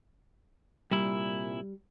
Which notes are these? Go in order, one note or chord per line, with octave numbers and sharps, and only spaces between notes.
C2 A#2 G3 E4